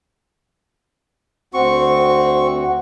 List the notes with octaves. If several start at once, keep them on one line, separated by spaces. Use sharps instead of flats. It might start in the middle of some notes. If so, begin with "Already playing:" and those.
D2 C4 F#4 C#6